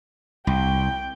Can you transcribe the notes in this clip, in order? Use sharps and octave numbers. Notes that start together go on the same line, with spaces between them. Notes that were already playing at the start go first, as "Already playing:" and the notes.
C2 G5